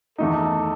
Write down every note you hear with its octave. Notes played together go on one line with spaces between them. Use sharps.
E2 D#3 A3 D#4 A4